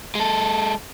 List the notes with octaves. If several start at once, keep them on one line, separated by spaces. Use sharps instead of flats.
G#3 A4